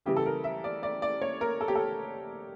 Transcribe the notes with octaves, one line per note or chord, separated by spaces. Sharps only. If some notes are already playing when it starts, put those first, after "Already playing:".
C#3 E3 G3 G4
A4
A#4
E5
D5
D5
D5
C#5
A#4
A4
G4
A4